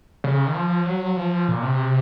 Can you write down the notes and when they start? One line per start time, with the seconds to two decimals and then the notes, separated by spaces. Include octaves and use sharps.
0.24 C#3
0.47 D#3
0.54 F3
0.86 F#3
1.17 F3
1.48 A#2
1.63 C3